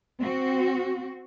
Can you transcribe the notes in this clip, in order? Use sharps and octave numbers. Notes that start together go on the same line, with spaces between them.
C4 F#4